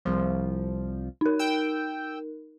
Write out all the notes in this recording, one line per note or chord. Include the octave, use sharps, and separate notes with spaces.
C2 F3
D#4 A#4
G5 E6